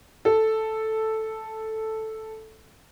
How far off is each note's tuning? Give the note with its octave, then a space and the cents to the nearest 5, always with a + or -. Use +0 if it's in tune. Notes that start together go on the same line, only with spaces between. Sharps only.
A4 +0